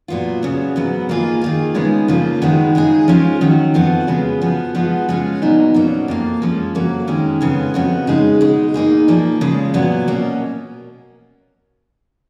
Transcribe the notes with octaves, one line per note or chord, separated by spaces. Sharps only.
A#2 F#3 B3 F4
C#3 F#3 B3
G#2 F#3 B3
D#3 A#3 F4 G#4
D#3 A#3 F4 G#4
C#3 G#3 B3 D#4
C#3 F3 A#3 F4
D#3 G#3 B3 D#4 F#4
C#3 G#3 D#4 G#4
F3 G#3 C#4 F4
D#3 F#3 C#4 F#4
F2 F3 B3 F#4
C#3 G#3 B3 F4 G#4
F3 B3 F#4
F3 G#3 B3 F#4
C#3 G#3 C#4 F4 G#4
A#2 F#3 B3 D#4
B2 F#3 A#3 C#4
F2 F3 A#3
F3 G#3 C#4
F2 C#3 F#3 A#3
D#3 G#3 C#4
F2 C#3 G#3 B3
F2 C#3 F3 B3 F#4
C#3 G#3 D#4 G#4
B2 G#3 D#4
B2 A#3 D#4 G#4
A#2 F3 A#3
C#3 F3 G#3
A#2 F#3 B3 F#4
B2 A#3 C#4